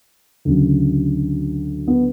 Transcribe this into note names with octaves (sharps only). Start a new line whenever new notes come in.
D2 C#3 F#3
B3